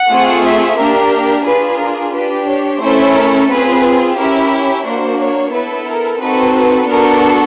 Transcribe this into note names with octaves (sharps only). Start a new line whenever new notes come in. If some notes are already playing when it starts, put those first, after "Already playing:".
Already playing: F#5
A3 C4 F4 G#4
E5
A#3 D4 G4 A#4
D4 F4 G#4 B4
A#4
D4 G4 B4
C#5
A3 C#4 E4 A4 C5
A#4
C4 F4 G#4 B4
C#4 E4 G4 A#4
A#3 D4 F#4 C5
C#5
B3 E4 A4 B4
A#4
C4 D#4 F#4 A4 B4
B4
B3 D4 F#4 A4 A#4